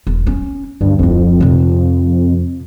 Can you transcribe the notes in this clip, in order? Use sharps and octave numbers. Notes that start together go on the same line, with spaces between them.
E1
C#4
D2 G2
D1 F2 E4
C3 F3